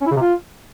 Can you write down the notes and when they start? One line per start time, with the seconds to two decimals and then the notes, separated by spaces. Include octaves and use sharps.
0.01 C#4
0.06 E4
0.11 C#3
0.16 C3
0.22 F4